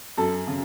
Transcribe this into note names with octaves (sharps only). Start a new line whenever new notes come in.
F#2 A4
C#3